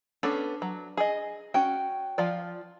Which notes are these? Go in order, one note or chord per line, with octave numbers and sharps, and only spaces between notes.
B3 C#4 D4 A4
F#3
G#4 D#5
C#4 F#4 G5
F3 F4 D5